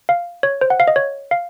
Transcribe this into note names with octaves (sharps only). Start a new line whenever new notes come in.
F5
C#5
C5
F#5
F5
D#5
C#5
F5